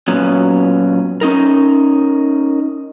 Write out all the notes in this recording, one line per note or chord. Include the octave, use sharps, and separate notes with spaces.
A#2 F#3 B3 C#4
C#4 D#4 A#4